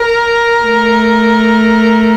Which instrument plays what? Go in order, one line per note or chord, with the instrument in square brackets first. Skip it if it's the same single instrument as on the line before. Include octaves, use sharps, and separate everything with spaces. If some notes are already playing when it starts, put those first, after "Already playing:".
Already playing: [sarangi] A#4
[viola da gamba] A3